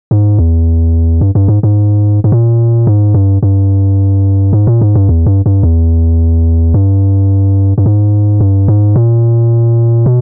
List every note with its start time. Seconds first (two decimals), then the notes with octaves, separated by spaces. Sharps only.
0.11 G#2
0.38 E2
1.21 G2
1.35 G2
1.48 G#2
1.63 G#2
2.24 G#2
2.32 A#2
2.87 G#2
3.14 G2
3.43 G2
4.53 G#2
4.67 A#2
4.81 G#2
4.95 G2
5.09 E2
5.26 G2
5.46 G2
5.63 E2
6.74 G2
7.78 G2
7.86 G#2
8.40 G2
8.68 G#2
8.96 A#2
10.06 B2